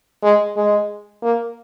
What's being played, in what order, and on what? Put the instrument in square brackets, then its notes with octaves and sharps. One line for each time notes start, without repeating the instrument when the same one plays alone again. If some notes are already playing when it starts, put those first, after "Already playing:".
[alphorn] G#3
G#3
A#3